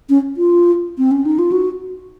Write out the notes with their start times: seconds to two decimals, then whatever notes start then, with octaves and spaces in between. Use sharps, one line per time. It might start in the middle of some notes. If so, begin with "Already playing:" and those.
0.09 C#4
0.37 F4
0.98 C4
1.11 C#4
1.26 D#4
1.39 F4
1.52 F#4